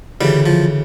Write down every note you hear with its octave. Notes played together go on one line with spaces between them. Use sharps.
D2 C#3 E3 G3
F3